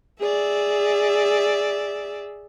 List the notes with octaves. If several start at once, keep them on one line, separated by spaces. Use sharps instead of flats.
G#4 D5 E5